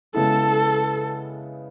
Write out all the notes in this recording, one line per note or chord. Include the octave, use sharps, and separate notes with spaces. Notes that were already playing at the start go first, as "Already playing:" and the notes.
C#3 G#3 B3 E4 A4